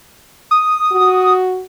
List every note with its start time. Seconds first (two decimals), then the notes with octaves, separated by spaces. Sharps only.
0.51 D#6
0.92 F#4